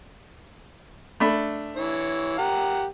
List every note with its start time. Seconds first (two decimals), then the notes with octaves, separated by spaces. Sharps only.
1.20 A3 D4 B5
1.77 E3 C#5
2.38 G4 A#4 F#5